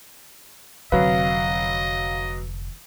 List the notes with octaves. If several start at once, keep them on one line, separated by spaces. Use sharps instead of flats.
F1 D3 F#3 B4 D#5 F5